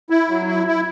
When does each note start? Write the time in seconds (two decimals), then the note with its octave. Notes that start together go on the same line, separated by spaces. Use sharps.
0.10 E4
0.29 F#3
0.47 E4
0.67 E4